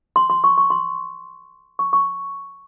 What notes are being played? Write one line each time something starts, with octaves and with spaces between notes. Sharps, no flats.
C6
C6
C#6
C#6
C6
C#6
C#6